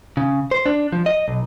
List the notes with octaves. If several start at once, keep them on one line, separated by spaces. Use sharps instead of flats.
C#3
C5
D4
F3
D#5
B1